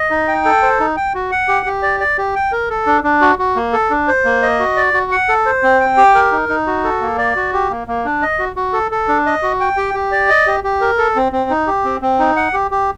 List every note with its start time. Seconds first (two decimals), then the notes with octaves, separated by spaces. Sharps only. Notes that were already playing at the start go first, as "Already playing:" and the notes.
Already playing: D#5
0.10 D#4
0.28 G5
0.45 A4
0.62 C5
0.80 D#4
0.96 G5
1.15 F#4
1.31 F#5
1.48 G4
1.66 G4
1.83 D5
2.00 D5
2.18 G4
2.35 G5
2.52 A#4
2.70 A4
2.86 D4
3.04 D4
3.21 F#4
3.39 F#4
3.56 A#3
3.73 A4
3.90 D4
4.08 C5
4.25 A#3
4.42 D#5
4.59 F#4
4.77 D5
4.94 F#4
5.11 F#5
5.28 A4
5.46 C5
5.63 C4
5.80 G5
5.97 G4
6.15 A#4
6.32 D#4
6.49 D#4
6.67 F#4
6.84 A4
7.01 A#3
7.18 D5
7.36 F#4
7.53 G4
7.70 A#3
7.88 A#3
8.05 D4
8.22 D#5
8.39 F#4
8.56 F#4
8.73 A4
8.91 A4
9.08 D4
9.26 D#5
9.43 F#4
9.60 G5
9.77 G4
9.94 G4
10.12 D5
10.29 D#5
10.47 G4
10.64 G4
10.81 A#4
10.98 A4
11.16 C4
11.32 C4
11.50 D#4
11.67 G4
11.85 C4
12.02 C4
12.19 D#4
12.36 F#5
12.53 G4
12.71 G4